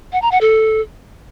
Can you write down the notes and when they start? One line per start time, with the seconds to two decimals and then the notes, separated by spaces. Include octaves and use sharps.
0.13 F#5
0.22 A#5
0.32 F#5
0.41 A4